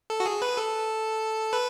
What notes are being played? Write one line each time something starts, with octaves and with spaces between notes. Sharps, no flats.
A4
F#4
G#4
B4
A4
B4